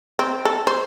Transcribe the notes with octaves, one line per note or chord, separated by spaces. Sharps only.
C4
A4
C5